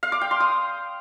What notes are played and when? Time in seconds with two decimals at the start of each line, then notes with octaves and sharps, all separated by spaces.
0.03 F5
0.12 D6
0.22 G5
0.31 C6
0.40 D#6